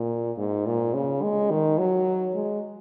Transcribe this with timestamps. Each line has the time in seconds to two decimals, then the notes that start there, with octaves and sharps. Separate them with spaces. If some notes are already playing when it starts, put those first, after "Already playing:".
Already playing: A#2
0.38 G#2
0.66 A#2
0.94 C#3
1.22 G#3
1.51 D#3
1.78 F#3
2.34 G#3